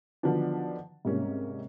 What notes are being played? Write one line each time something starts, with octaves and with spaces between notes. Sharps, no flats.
D3 D#3 F3 F#3 B3 D4
G#2 C3 G3 A#3 C#4